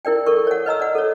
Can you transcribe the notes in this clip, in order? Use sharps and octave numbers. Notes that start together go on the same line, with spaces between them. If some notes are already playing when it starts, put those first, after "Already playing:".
E4 A#4 D5 G5
A4 A#4 C#6
C#5 F#5
B4 D#5 A#5 E6
D5 F#5
A4 C#5